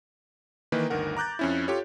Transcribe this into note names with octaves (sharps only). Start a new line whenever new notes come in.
D#3 E3 A#3 D#4 B4
G1 D2 D#3 A#4 F#5
A#5 D6 F#6 G6 A6
F2 C#4 E4
F4 G4 A4 C#5